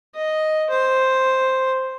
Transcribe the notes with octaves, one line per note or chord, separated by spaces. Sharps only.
D#5
C5